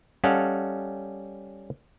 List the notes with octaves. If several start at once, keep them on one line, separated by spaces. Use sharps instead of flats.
G3 C#4 A4 D#5 F5 F#5